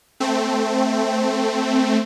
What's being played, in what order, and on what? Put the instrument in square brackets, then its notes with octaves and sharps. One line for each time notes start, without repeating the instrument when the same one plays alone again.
[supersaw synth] A3 C4